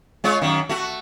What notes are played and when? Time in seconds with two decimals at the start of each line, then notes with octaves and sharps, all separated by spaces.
0.24 G#3 F4 C#5
0.42 F#2 D#3
0.69 A3 F#4